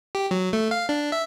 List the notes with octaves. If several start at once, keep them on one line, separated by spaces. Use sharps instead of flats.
G4
F#3
A3
F5
D4
E5